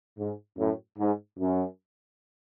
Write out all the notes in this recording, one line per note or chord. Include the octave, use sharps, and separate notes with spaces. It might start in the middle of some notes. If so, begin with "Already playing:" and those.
G#2
F#2 A2
G#2
F#2